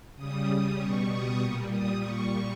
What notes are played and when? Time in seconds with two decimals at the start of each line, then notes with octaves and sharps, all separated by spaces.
0.16 C#3 G3 D#6
0.78 B2 G3 C#6
1.10 D#6
1.40 A#2 G3
1.71 D#6
2.02 A#2 G3 C#6